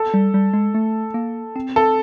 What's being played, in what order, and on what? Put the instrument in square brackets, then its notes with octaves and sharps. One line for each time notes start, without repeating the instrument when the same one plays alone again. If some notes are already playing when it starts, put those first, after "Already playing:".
Already playing: [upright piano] A4
[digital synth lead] G3
G3
G#3
A3
A#3
C4
[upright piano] A4